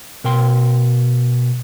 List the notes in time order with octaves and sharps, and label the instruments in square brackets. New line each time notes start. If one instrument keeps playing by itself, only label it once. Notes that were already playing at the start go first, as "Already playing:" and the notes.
[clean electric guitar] B2 A#4 G5 C6